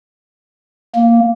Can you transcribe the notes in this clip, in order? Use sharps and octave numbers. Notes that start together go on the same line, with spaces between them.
A#3